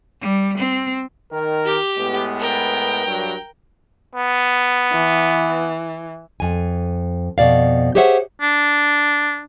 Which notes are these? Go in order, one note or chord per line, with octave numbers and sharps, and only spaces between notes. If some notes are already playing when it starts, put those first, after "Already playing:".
G3
C4
D#3 A#4
G4
A2 G#3 B3
A#4 G5
G2 F#3
B3
E3
F2 G#5
F2 B2 D5 F5
G4 G#4 C5 C#5 E5 F#5
D4